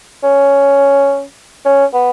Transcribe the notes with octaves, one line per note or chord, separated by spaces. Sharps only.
C#4
C#4
B3